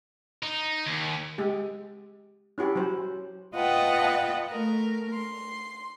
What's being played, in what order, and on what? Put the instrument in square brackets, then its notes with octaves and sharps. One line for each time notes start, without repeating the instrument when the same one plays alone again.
[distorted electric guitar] D#4
D#2
[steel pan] G#3 G4
C#4 E4 F#4 G4
F#3 C5
[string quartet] F4 B4 D#5 F#5 G5 A5
A3 A#4
C6